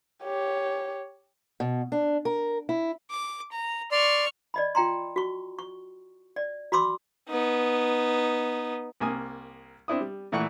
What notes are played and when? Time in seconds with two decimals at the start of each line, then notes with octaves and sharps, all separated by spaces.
0.23 G4 C#5
1.60 B2
1.92 D4
2.25 A#4
2.69 E4
3.10 D6
3.52 A#5
3.92 D5 C6 C#6 F6
4.54 D5 D#5 B5
4.75 F4 G5 A#5 C6
5.16 F#4 C#6
5.59 C#6
6.36 D5
6.72 F#4 B5 C6 D6 E6
7.29 B3 D#4
9.00 C2 A#3 G#5 D#6
9.88 C4 D4 E4 D#6
10.01 G3
10.32 A#2 E3 A3 F#5 C#6 F#6